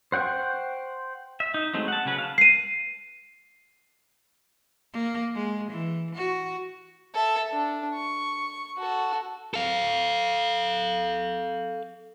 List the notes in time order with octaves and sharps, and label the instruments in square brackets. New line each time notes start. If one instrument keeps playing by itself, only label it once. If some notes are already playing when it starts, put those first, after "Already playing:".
[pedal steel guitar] C5 F#5 G5 C#6
E5
D#4
F#3 G#3 A3 C4 D#4
F#5 A5
C#3 F#3 C#4 B4
F5 A5
[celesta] C7 D#7
[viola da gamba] A#3
G#3
E3
F#4
[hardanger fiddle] A4 E5
D4
C#6
F#4 A4
[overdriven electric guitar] A4 F5